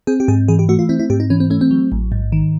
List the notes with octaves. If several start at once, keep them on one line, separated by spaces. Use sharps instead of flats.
C4 G#4
G4
G#2 G#4
E3 G#4
G4
A3 F#4
F4
C4 E4
E4
G#2 G4
D#4
E3 C#4
C4
A3 C#4
C4
F#3
A1
G#2
D#3